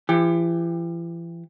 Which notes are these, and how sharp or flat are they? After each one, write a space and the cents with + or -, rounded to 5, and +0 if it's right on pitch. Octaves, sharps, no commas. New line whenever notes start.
E3 +40 G4 +30